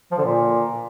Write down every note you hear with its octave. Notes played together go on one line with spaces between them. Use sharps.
F3
D3
A#2